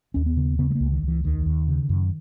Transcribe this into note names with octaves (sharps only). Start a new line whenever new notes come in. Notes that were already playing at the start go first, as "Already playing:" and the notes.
D#2 C#4
B3
C#3
C#3 B3
G#3
A#3
C#2
D#3
C#2
E3
D#2 D#3
D#2
C#3
F#2